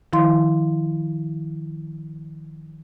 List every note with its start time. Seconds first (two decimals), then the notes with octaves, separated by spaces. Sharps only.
0.13 D#3 F3 E4 F5 C6